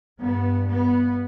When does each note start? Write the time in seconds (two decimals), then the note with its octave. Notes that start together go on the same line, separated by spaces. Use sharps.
0.20 G2 B3
0.68 B3